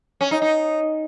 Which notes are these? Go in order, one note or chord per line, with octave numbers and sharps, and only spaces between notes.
C#4
D#4
D#4